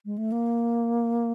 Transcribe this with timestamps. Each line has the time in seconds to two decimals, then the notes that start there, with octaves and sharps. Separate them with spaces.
0.05 G#3
0.18 A3
0.32 A#3